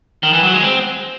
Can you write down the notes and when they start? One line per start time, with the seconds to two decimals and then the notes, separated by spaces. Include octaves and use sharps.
0.23 D#3
0.33 E3
0.43 F#3
0.53 G#3
0.63 C4